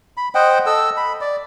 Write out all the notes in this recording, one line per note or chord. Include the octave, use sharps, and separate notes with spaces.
B5
C5 D#5 F#5 G5
A4 D#5 E6
B5
D5